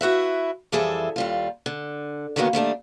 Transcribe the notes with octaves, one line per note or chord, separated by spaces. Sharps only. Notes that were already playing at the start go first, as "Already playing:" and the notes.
E4 F#4 B4 E5
F2 E3 G3 G#4 A4 E5
D#2 G3 F4
D3
D3 D#3 F#3 G#3 A#3 B3
D#3 G3 A3 D4